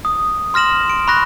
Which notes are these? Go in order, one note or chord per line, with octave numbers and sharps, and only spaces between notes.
D#6
C6 F6 A#6 E7 F#7
D7
B5 C#6 F#6 A#6